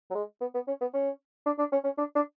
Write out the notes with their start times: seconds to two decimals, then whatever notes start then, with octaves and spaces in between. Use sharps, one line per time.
0.10 F#3
0.15 G#3
0.41 B3
0.54 B3
0.67 C#4
0.81 B3
0.94 C#4
1.46 D4
1.58 D4
1.72 C#4
1.84 C#4
1.98 D4
2.15 D4